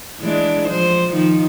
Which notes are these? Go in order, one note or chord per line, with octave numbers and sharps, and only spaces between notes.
E3 G#3 D4
F3 C5
D#3 F3 D#4